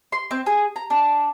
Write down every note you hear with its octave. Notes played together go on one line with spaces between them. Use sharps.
C6
C4
G#4
A#5
D4